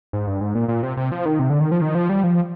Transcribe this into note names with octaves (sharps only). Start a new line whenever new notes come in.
G#2
G2
G#2
A#2
A#2
C3
C3
F3
D#3
C3
D3
D#3
F3
D#3
F3
G3
F3